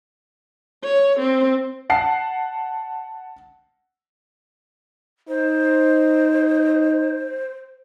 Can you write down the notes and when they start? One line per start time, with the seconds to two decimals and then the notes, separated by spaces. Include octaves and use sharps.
0.84 C#5
1.19 C4
1.90 F#5 A5 C7
5.29 D#4 C5